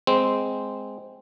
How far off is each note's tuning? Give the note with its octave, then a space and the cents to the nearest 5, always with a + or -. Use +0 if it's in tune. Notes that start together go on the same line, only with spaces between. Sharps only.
G#3 +0 C4 -10